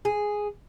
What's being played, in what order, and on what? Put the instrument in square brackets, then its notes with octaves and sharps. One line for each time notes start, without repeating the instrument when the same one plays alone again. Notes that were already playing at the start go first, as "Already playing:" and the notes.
[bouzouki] G#4